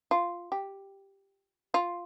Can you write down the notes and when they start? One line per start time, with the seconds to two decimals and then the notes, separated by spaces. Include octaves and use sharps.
0.11 F4
0.52 G4
1.74 F4